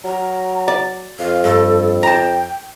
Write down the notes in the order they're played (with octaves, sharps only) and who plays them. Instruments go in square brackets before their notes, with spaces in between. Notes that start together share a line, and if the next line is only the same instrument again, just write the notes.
[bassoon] F#3 [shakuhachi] A#5
[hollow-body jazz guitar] D5
[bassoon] F2 [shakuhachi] F5
[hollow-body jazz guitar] G2 [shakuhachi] A4
[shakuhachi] G5 [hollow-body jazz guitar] A5 A#5